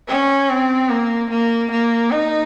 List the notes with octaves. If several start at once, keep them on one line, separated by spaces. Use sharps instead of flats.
C#4
C4
A#3
A#3
A#3
D#4